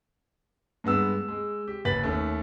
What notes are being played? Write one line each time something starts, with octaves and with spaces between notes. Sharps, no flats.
G2 G#3 B3 E6
G#3
G4
F#1 B4 A6 B6 F#7
D#2 A3 C#4